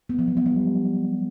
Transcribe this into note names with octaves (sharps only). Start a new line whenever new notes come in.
B3
F3
F#3
B3
G3